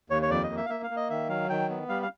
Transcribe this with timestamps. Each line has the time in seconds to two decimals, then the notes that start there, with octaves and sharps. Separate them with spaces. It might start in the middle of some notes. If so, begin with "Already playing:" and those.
0.10 D#2 C#5
0.22 C#5
0.30 F2 D5
0.43 D#5
0.50 A#3
0.57 E5
0.66 F5
0.69 A#3 E5
0.84 F5
0.90 A#3
0.96 D#5
1.10 D#3 E5
1.29 F#3 F5
1.49 D#3 G5
1.70 B3
1.89 G3 F5
2.02 F5